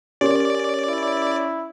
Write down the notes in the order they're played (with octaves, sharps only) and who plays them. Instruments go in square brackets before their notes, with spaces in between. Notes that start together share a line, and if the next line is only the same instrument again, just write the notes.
[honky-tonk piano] C#4 [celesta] G4 A#4 [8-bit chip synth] D5
[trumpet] E4